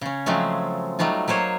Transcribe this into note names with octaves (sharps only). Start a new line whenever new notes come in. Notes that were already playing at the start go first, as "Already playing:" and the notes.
C#3 C#4
C#3 F3 F#3 G#3 A3 C4
F#3 G3 A3 D#4 F4
F#3 A#3 C5 C#5